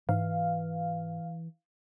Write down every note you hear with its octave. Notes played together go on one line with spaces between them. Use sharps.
G#2 E3 F5